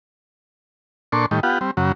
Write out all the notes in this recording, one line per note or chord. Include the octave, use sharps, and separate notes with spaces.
A#2 D4 A4 C6 C#6
A2 D#3 G3
B3 F4 G4 F#5
G3 C4
F#2 C#3 F#3